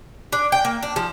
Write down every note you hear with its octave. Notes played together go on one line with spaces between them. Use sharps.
D4
G5
A#3
D4
F3